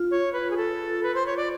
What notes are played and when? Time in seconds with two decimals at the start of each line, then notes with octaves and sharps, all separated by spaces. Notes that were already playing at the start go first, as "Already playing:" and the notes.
Already playing: F4
0.11 C#5
0.33 B4
0.51 G#4
0.57 A4
1.03 B4
1.15 C5
1.26 C#5
1.37 D5